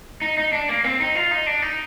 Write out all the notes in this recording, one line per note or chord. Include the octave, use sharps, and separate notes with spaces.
D#4
D#4
D4
A#3
C4
D#4
F4
D#4
D4
D#4